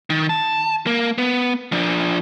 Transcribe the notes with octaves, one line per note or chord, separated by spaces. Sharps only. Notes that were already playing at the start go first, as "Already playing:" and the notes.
D#3
A5
A#3
B3
F3 D4